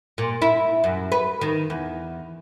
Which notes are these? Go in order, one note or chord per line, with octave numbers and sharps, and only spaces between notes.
A#2
E4
F#2
B4
D#3
E2